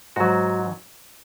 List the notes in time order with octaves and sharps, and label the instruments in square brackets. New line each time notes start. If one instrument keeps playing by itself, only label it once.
[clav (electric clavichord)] G#2 F#3 F#4